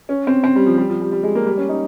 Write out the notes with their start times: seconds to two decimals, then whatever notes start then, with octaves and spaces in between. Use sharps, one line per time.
0.09 C#4
0.27 C4
0.44 C4
0.56 G3
0.66 F3
0.77 G3
0.89 F3
1.01 G3
1.12 G3
1.23 G#3
1.35 A#3
1.46 G3
1.57 C#4
1.69 D#4